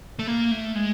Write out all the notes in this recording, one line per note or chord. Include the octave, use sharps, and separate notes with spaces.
A3
A#3
A3
G#3